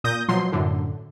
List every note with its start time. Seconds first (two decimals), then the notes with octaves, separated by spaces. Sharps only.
0.04 A#2 D#6 G6 A#6
0.28 B2 F3 F#3 C6
0.52 F#2 A2 D3